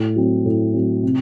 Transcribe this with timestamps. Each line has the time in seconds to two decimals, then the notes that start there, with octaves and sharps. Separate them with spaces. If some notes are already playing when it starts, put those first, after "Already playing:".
Already playing: A2
0.16 F#3 C4
0.45 A2
0.74 F#3 C4
1.03 C3